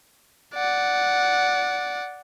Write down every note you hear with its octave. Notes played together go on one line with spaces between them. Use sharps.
D5 F#5